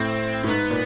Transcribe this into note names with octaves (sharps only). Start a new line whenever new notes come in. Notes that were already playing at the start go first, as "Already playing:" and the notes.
Already playing: A2 C4
A2
G#2 B3
A#2